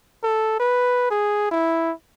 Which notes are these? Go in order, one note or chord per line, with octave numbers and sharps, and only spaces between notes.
A4
B4
G#4
E4